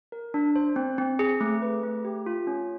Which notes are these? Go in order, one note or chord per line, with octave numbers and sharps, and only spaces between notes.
A#4
D4
C5
C4
C4
G#4
A3
B4
A3
G4
F4
C#4